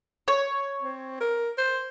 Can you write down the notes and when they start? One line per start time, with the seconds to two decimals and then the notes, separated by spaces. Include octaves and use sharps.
0.28 C#5
0.82 C4
1.21 A#4
1.58 C5